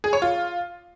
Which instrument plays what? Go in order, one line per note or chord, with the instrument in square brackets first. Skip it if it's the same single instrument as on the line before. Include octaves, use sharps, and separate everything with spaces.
[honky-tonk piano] G#4
C#5
F4